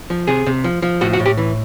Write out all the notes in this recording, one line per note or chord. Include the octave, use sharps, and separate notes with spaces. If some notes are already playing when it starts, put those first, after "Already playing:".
F3
C3 G#4
C3
F3
F3
A2 F#4
F#4
A2
G4
E3